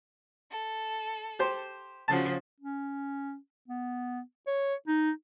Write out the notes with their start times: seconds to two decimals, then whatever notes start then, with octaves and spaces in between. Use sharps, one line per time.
0.51 A4
1.39 G4 C5
2.08 C#3 F3 F#4 A5
2.61 C#4
3.68 B3
4.47 C#5
4.88 D#4